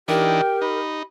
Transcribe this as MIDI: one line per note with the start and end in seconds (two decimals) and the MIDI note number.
0.08 0.41 52
0.08 0.41 62
0.08 0.41 63
0.08 1.00 67
0.08 0.79 70
0.08 0.60 79
0.61 1.03 63
0.61 1.04 83